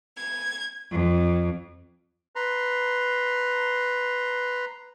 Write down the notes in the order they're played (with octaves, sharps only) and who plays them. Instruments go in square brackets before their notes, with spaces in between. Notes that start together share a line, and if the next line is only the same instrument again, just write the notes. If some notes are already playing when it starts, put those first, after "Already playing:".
[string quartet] G#6
F2
[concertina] B4 A#5 C6